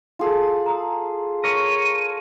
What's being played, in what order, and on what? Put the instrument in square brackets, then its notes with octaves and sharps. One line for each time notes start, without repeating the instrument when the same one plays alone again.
[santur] F4 G#4 A4
[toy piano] A#5 D#6 E6
[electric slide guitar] A#4 C#5 [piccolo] D#7